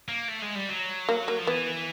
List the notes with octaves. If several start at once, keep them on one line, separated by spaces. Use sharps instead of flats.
A#3
A3
G#3
G3
F#3
A#3
A#3
F3
E3 B3